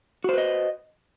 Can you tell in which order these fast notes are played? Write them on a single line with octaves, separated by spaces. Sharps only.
F#4 C5 B4 D#5